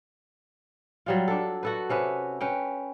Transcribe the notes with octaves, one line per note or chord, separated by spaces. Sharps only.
F#3 G3 F4
D4 A4
F#4 A4 B4
C3 C#4 B4 E5
C#4 B4 G5